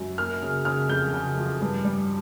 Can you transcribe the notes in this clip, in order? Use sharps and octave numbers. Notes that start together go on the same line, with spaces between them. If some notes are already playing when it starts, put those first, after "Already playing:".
Already playing: F#2
A#3 F6
C#3
C#3 F6
F2 G6
C#3
F3
G2
G3